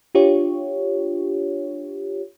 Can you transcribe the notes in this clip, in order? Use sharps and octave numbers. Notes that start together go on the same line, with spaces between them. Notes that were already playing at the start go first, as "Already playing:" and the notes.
D4 F4 G4 C#5